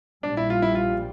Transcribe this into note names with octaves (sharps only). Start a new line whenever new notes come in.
A#1 A#2 G3 D4
E4
F4
E4
F4